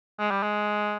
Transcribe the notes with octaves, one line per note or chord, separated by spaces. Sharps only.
G#3
G3
G#3